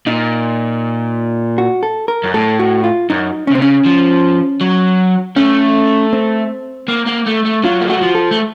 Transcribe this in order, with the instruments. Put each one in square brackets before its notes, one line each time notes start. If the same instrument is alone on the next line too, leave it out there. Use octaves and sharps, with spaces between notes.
[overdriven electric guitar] A#2 [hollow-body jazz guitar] D#4
[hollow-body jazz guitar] F#4
A4
A#4
[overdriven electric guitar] F#2
[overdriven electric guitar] A2 [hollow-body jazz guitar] A4
[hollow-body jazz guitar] F#4
F4
[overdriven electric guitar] F#2 [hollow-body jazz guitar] D#4
[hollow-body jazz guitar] C#4
[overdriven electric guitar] C3
[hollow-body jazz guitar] C4
[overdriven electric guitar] C#3 [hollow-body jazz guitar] C#4
[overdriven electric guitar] F3
F#3
[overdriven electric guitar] A3 [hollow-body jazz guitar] C#4
[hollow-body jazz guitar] C4
[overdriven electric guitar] A#3
A#3
A3
A3
[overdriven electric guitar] F#3 [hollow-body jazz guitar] F4
[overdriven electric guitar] A#3
[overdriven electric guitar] A3 [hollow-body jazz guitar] F#4
[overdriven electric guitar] F#3
F3
[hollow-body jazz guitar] A4
[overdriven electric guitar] A3